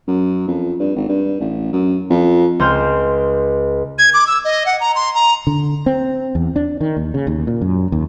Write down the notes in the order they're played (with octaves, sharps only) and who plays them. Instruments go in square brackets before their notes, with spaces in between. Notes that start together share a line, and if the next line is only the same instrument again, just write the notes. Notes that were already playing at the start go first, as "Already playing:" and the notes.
[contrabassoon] F#2
F2
G2
G#1
G2
A1
F#2
F2
[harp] C#2 C5 G5 F6
[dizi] G#6
D6
E6
D#5
F#5
A#5
C6
A#5
[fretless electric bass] D3
C4
E2
D4
D#3
D#2
C#3
D#2
A#2
F#2
D#2